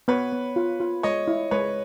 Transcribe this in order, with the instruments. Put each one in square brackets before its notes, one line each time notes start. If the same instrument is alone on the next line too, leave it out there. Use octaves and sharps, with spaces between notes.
[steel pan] B3 [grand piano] B4 C#5
[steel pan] B3
F4
F4
[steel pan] G#3 [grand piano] C#5 D#5
[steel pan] E4
[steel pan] G#3 [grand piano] B4 C#5